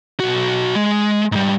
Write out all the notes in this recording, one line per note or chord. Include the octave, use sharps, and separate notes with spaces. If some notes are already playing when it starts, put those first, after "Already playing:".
B1 F#4
G#3
G#2 G3